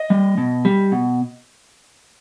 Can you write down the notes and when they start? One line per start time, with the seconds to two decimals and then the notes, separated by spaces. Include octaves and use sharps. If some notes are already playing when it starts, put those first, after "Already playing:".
Already playing: D#5
0.10 G3
0.38 B2
0.65 G3
0.92 B2